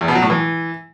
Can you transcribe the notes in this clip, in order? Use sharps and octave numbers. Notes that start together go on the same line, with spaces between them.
E2
B2
F#3
A2
E3